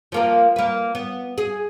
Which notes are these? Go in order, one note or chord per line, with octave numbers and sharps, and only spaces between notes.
F3 A#3 A#4
A#3 B4
B3
G#4